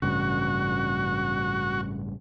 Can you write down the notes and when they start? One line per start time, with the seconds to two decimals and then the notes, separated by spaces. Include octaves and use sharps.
0.02 A1 G2 C#3 F#4